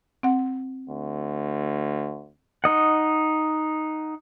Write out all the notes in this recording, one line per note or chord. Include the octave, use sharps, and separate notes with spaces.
C4 F#5
D2
D#4 D#5 F#5